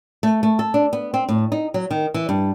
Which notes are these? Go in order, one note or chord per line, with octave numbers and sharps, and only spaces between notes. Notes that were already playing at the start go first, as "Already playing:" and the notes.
A3
A3
A4
D4
B3
C4
A2
D#4
F#3
D#3
E3
G2